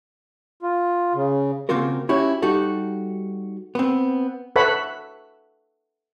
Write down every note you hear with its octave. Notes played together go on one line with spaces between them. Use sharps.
F4
C#3
C#3 A#3 C4 F4 F#4 A#4
C#4 E4 F#4 G4 C#5
G3 D#4 F#4 G4 A4
B3 C4
A4 B4 C#5 E5 F#5 B5